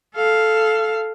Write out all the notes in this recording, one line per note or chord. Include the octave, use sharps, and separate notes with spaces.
A4 F5